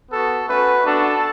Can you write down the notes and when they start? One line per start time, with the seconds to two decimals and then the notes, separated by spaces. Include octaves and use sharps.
0.10 B3 F#4 A4
0.48 A3 C#4 F#4 B4
0.85 B3 D4 F#4 A4